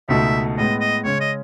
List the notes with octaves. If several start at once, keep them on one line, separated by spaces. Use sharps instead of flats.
C#2 B2 A3 D#4 E5
A2 G#3 B3 D#5
D#5
C#3 G#3 C#4 C#5
D#5